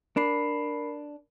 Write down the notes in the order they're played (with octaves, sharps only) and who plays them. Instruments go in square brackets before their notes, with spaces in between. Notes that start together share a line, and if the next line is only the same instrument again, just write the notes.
[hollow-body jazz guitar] D4 [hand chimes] A#4 B5 C7